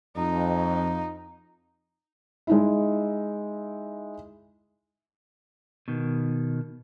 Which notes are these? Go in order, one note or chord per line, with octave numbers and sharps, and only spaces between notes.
F2 D#4
G#3 D#4 E4
B2 D#3